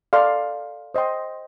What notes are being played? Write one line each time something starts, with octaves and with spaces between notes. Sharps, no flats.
A4 D5 F5 C6
C5 D#5 G5 C6